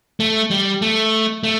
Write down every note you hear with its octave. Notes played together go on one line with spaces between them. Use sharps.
A3
G3
A3
A3